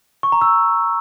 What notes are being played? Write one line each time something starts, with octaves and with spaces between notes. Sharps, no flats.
C#6
A#5
E6